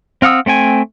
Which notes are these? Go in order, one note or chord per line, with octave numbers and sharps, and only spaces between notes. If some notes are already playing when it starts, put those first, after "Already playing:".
C4 F5 F#5 D#6 E6
A3 C4 G5 G#5